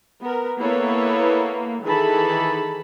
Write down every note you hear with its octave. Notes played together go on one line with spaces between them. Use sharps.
B3 A#4
A#3 B3 E4 A4 B4 C#5
D#3 E3 G#4 A4 A5 B5